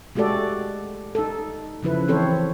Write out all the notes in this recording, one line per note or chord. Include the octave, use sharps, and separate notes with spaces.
G#3 A3 F#4 G4 A4 D5
D#4 A4
C#3 F3 E4 B4
E3 C4 A4 C5 C#5